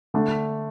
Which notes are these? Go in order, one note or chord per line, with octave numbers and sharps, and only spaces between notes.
D3 A3 D4